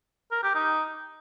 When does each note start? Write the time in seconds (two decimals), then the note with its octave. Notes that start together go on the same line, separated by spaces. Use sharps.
0.32 A#4
0.43 G4
0.55 D#4